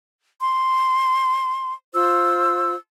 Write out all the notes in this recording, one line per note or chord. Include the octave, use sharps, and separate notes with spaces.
C6
F4 C5 E6